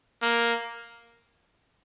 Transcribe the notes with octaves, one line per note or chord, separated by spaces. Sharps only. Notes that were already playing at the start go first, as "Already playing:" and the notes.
A#3